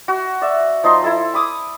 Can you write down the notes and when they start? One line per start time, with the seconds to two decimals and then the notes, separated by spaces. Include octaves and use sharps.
0.08 F#4
0.41 D5 E5
0.84 F3 D#4 D#5 C6
1.02 E4 A4 C5
1.34 B5 D6 D#6